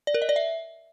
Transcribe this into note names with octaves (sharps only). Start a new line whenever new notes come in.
D5
A#4
D#5
D5
E5